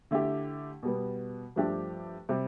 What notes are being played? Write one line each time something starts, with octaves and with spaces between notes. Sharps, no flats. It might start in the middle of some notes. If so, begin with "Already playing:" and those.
D3 A3 E4 G4
B2 G3 B3
G2 F3 A3 D4 G4
C3 G3